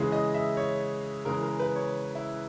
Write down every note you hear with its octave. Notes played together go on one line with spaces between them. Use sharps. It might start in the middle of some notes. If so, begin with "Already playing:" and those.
Already playing: C#3 E3 G#3
D#5
E5
C#5
C#3 E3 G#3 A#4
A#4
B4
C#5
E4